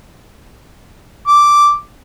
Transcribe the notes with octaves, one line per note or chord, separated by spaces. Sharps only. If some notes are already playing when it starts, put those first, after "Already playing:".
D6